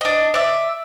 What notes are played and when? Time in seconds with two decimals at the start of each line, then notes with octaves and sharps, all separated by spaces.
0.01 D4 D#5
0.34 D5 E5